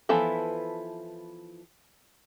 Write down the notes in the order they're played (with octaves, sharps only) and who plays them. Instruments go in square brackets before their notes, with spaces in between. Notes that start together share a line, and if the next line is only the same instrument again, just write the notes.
[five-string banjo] E3 F3 B3 E4 A4